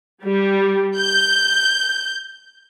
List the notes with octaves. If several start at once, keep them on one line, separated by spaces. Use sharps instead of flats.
G3
G6